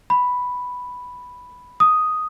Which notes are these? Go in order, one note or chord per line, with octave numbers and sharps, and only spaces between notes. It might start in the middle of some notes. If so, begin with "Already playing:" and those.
B5
D#6